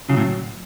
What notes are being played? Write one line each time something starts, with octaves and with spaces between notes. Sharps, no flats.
C#3 F#3
A2